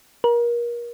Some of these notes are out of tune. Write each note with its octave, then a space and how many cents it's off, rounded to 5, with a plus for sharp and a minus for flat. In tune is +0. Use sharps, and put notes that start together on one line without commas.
A#4 +30